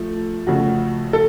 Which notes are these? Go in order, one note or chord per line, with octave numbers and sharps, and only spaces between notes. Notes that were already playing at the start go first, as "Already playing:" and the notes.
Already playing: F3 A3
F2 C#3 A3 F#4
A4